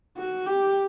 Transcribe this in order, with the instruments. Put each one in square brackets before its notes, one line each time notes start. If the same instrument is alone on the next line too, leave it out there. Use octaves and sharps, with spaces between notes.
[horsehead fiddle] F#4
G4